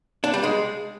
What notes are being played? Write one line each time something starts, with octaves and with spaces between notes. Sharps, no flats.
D4
G3
G#3